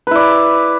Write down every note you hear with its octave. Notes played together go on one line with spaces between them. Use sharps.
E4 B4 D5